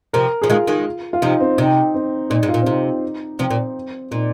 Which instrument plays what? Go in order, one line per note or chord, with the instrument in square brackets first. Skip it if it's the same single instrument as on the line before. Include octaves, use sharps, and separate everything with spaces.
[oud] C3 F3 [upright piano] A#4
[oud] F3 [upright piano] G#4
[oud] D#3 G#3 [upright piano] F4
[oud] D#3 G#3
[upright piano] F4
[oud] C3 F3 [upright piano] D#4
[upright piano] C4
[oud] C3 [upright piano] D#4
[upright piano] C4
[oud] A#2 [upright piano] D#4
[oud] G#2
[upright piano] F4
[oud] A#2
[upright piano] C4
[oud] C3 [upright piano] D#4
[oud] C3 F3 [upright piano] C4
[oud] A#2
[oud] A#2 [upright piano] D#4